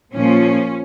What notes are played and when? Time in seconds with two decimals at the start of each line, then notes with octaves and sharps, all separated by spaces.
0.13 A#2 F3 C#4